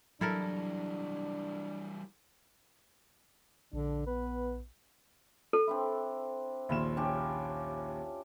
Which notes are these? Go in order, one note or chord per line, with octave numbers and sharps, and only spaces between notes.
E3 F#3 G3 D4 E4 A4 A#4
A#1 D3 D4
B3 B4
A4
C4 D4 E4
A#1 D#2 E4 F4 E7
C#4 D4 G4